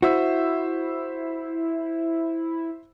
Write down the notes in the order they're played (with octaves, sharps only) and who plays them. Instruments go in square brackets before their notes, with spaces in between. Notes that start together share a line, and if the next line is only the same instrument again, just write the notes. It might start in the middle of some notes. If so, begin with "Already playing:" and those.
[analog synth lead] E4 [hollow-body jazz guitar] F#4 [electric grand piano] C5 E5 E6